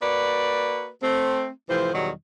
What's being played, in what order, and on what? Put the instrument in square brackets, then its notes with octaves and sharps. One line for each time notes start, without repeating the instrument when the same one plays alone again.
[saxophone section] A#3 F#4 B4 D5
A3 C4
A2 C3 E3 F3 C5
E2 B2 D#3 F#3 G3